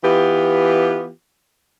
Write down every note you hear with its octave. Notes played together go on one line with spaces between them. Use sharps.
E3 B3 F4 G4